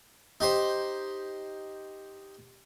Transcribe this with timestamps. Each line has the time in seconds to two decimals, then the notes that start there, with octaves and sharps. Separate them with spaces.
0.40 D#4 G4 C5